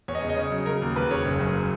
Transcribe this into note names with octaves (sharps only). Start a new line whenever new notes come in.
E2 C#5
D#5
C#3 C#5
D#5
C#3 C#5
F#3
C#3 A#4
D#2
E1 B4
C#3 C#5
F#1
F#2